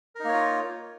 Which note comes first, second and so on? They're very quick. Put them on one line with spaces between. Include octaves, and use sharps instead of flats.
A#4 D#4 A#3 C#5 F4